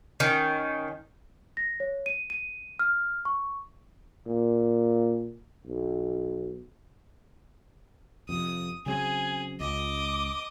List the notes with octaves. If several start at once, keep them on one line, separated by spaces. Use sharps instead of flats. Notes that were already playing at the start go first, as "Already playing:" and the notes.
D#3 C#4
A#6
C#5
D#7
D#7
F6
C#6
A#2
B1
F2 C3 D#6
C#3 F#3 C4 G#4 G#5
C#2 D#5 D6